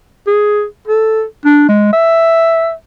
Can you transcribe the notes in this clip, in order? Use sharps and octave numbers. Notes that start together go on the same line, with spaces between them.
G#4
A4
D4
G#3
E5